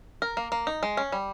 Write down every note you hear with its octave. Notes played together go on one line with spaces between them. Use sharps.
A#4
A#3
A#3
D#4
G#3
C#4
G3